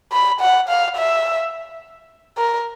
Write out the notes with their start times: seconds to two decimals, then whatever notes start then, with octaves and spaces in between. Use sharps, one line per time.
0.12 B5
0.40 F#5
0.68 F5
0.96 E5
2.37 A#4